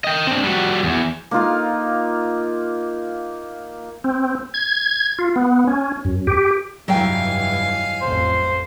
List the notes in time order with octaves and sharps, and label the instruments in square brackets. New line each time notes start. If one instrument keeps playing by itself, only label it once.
[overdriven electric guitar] D#5 G5
C4 D4
G3 F#4
E2
[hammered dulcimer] A#3 D#4 F4 F5
[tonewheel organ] C4
G#6
F4
B3
C#4
F#2
G4
[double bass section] F1 G2 E3 [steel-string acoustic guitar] F#3 D#5 G5 [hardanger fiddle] F5 G#5
[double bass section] A1 F2 [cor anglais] C5